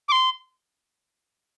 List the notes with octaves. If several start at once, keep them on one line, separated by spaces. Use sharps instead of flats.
D6
C6